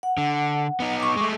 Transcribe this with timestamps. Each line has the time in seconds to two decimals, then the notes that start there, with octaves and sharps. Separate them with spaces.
0.03 F#5
0.18 D3
0.80 B3 D#4
1.00 C#6 D6
1.17 G#3 A3